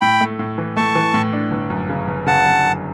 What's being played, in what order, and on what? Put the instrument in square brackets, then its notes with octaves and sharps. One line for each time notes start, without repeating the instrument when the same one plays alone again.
[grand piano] A2 [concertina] G5 B5
[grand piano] A3
A2
E3
[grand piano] A3 [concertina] A5 C#6
[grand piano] E3
A2
D4
G1
F#2
C#3
G1
[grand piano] C#3 [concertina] F#5 A5
[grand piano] G1
F#2